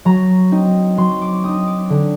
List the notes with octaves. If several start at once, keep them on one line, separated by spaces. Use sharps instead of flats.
F#3 A#5
C4 D#4
F#3 C6
D6
C4 D#4 D#6
D6
D3